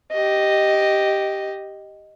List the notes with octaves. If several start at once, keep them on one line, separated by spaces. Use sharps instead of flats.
G4 D#5